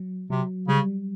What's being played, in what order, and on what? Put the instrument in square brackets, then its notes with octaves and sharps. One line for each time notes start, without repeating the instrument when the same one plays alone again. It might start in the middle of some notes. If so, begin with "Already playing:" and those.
Already playing: [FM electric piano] F#3
[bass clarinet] C3 [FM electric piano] F#3
[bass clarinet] C#3 [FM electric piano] G3